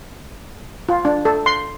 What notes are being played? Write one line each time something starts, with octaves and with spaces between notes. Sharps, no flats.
F4
D4
A4
C6